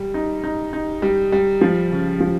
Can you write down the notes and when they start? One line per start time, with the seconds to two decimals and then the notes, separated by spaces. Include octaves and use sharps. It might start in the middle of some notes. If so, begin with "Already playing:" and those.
Already playing: G3
0.14 D#4
0.44 D#4
0.73 D#4
1.02 G3
1.32 G3
1.61 F3
1.91 C#3
2.20 F3